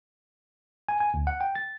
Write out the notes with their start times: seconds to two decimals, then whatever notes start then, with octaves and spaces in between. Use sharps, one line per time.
0.89 G#5
1.00 G#5
1.14 D2
1.27 F#5
1.41 G5
1.55 A6